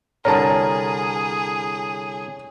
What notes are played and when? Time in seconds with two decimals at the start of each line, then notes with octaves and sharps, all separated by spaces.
0.25 C2 D3 G#4 A#4 C#5 A5